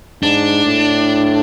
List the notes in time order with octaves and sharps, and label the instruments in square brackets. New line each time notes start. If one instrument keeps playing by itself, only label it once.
[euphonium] G#2 [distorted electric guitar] D4
[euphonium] A2